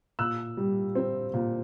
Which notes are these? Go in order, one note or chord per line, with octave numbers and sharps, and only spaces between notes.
A#2 E6 F#6
G3
C4
A#2